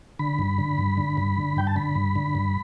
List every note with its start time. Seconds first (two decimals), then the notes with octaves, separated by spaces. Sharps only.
0.19 D3 B5
0.39 G2
0.58 D3
0.78 G2
0.97 D3
1.17 G2
1.37 D3
1.56 G2 G5
1.67 A5
1.76 D3 B5
1.95 G2
2.16 D3
2.35 G2